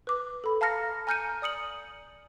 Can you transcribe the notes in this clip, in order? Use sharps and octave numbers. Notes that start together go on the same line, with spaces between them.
B4 D6
A4 B5
F5 A5 A#5 F6 A#6 C#7
G#5 A#5 F6 G6 C#7 D#7
D5 D#6 C#7 F#7